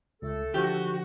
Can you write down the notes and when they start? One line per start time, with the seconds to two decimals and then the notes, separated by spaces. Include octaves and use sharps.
0.22 C#2 A3 A4
0.54 D3 F3 F#4 G4